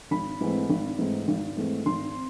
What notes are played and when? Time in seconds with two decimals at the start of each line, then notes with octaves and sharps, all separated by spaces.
0.11 G#1 B5
0.41 G#2 E3 A3 C4
0.70 G#1
0.98 G#2 E3 A3 C4
1.28 G#1
1.57 G#2 E3 A3 C4
1.86 G#1 C6
2.15 C4